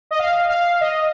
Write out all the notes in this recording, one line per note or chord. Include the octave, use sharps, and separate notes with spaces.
D#5
F5
F5
D#5